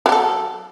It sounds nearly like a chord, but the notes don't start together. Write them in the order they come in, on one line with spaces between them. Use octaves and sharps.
F#3 G4 A4